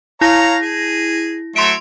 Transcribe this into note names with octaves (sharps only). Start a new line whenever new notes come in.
E4 C#5 F5 A#5 A#6
G#4
F#3 A3 E5 C6 D7